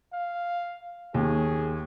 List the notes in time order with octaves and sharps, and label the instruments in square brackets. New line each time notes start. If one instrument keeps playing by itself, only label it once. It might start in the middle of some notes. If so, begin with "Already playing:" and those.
[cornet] F5
[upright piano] D#2 D#3 [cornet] G#4